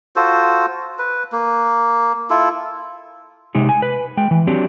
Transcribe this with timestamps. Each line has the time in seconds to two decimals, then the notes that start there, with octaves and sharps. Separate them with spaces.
0.16 F4 F#4 A4 C5
0.99 B4
1.32 A#3
2.30 E4 F4 A4
3.55 C3 G#3 D#4 G4
3.69 G#5
3.82 B4
4.17 G#3 G5
4.31 E3
4.47 F#3 C4 D4 G4